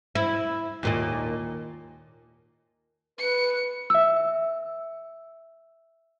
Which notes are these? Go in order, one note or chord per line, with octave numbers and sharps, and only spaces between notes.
E4
D#2 A#2 D#5
B4 C#7
E5 E6